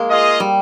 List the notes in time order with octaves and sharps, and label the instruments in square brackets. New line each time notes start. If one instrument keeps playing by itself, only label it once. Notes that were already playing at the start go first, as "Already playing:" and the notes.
Already playing: [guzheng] G#3 A#3
[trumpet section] F4 G#4 D#5
[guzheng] G3